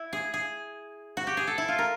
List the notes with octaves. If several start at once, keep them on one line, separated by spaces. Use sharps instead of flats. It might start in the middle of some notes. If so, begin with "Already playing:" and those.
Already playing: E4
G#4
G#4
F#4
G4
G#4
A4
E4
F4
A#4